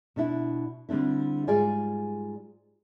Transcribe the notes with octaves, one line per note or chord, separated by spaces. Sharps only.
B2 D4 E4
D3 G3 C4 D4 E4
G#2 G3 F4 G#4 D5 G#5